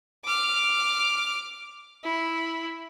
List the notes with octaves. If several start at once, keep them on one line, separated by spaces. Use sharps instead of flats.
D6 F6
E4